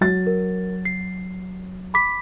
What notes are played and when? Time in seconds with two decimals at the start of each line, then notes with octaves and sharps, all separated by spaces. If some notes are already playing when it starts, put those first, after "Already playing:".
0.01 F#3 A6
0.27 A#4
0.85 C7
1.94 B5 D6 B6